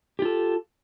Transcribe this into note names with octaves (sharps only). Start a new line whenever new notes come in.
F4 G4 A4